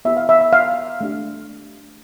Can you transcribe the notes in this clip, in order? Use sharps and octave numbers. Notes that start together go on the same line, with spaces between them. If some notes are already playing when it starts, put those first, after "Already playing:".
B3 E4 G4 E5
F5
E5
E5
F5
A3 D4 G4